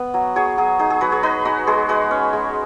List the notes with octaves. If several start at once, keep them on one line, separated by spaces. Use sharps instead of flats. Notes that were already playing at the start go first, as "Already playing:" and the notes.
Already playing: B3
F#3
F#3 G#4 C#5
F#3 G#4
D#4 G#4
G#4
F#3 F#4 B4
G#4 C#5
D#4 B4 D#5
D#4 F#4
G#3 G#4
G#3 F#4 B4
C#4
G#3